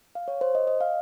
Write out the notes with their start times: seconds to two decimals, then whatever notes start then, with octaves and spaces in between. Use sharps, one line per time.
0.15 F5
0.28 C#5
0.41 C5
0.55 D#5
0.67 D#5
0.81 F5